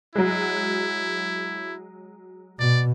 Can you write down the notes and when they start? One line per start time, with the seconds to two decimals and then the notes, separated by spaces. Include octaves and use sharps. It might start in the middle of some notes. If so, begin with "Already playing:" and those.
0.15 F#3 G#3 E4
2.59 B2 D5